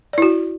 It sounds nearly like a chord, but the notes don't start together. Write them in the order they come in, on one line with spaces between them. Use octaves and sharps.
D5 E4 F#4